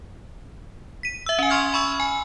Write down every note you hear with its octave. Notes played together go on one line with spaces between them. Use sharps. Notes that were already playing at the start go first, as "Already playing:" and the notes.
B6 D#7
E5 E6
C#4 G#5
C6 C#6 F6 G#6
B5 C#6 E6
G#5